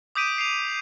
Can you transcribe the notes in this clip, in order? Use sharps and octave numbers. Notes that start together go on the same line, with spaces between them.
D6 D#6 G6 B6 D7 D#7
C7 F7